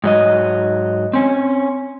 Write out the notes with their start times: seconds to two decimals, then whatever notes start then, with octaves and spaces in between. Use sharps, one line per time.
0.04 G#2 F#3 D#5
1.13 C4 C#4